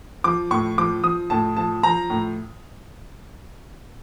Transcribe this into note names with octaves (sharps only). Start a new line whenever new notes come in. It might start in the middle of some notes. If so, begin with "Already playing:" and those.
F3 D6
A2 C#6
F3 D6
F3 D#6
A2 A5
F3 A5
F3 A#5
A2